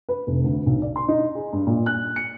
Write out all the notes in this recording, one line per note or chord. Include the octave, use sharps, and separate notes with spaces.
B4
F1
D2
B1
D5
C6
D#4
G#4
G2
A#2
F#6
C#7